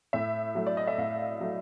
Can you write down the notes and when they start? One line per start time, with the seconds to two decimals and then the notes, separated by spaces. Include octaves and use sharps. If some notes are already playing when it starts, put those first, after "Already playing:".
0.13 A2 E5
0.55 F#3 A3
0.67 D5
0.77 D#5
0.87 E5
0.98 A2 F5
1.40 F#3 A3